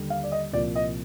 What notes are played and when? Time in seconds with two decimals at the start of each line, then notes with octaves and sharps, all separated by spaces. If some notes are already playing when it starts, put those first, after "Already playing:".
Already playing: D#2 D3 G3
0.10 F5
0.24 D5
0.32 D#5
0.53 C2 A#2 F3 A#3 D5
0.76 D#5